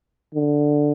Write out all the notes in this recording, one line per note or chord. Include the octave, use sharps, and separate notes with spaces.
D3